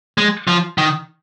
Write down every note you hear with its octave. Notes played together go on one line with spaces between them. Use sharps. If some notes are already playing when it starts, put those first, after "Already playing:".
G#3
F3
D#3